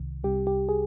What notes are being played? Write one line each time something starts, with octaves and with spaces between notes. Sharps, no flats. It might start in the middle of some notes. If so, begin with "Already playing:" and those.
Already playing: C2 C3 D#3
C2 C3 G3 G4
G4
G#4